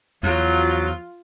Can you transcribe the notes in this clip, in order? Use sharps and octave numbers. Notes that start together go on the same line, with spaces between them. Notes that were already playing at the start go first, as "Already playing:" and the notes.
E2 F3 F#3 F4